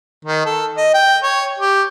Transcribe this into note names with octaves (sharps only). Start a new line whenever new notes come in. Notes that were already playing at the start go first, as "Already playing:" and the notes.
D#3
A4
D#5
G5
C#5
G4